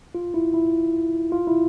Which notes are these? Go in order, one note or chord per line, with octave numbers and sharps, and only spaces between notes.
F4
E4
E4
F4
E4